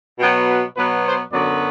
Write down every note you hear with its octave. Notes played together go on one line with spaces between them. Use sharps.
B2 F#3 B3 G5
B4
B2 F#3 B3 B4
C5
F#2 D3 F#3 B3 D5